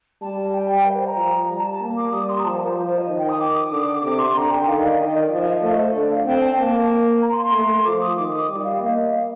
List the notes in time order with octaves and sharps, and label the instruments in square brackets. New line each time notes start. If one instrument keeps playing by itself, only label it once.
[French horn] G3 [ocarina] A5
[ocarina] G5
A#4
C5
A#5
[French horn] F3
[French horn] G3 [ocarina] A#5
[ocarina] A5
A5
[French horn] A#3
[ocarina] D6
[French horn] G3 [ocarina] D#6
[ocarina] C6
A#5
[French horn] F3 [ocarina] A5
[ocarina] A#4
C5
[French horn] F3 [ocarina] C5
[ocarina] C5
D#5
[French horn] D#3
[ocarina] G5
D#6
D6
D#6
[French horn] D3 [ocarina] D6
[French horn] C3 [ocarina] D6
[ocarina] C6
[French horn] D3 [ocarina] A#5
[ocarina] G5
[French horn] D#3 [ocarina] F5
[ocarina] D5
[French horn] D#3 [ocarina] D#5
[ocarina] D5
[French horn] F3
[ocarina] D#5
F5
[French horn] A3 [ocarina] D#5
[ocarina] C5
[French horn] D3 [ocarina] D5
[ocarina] F5
[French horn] C4 [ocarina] G5
[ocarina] A5
[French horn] A#3
[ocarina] A#5
C6
C6
[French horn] A3
[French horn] F3 [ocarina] D6
[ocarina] D#6
[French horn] D#3 [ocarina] D6
[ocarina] D#6
[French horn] G3
[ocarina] D#5
F5
[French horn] A#3 [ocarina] D#5
[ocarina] F5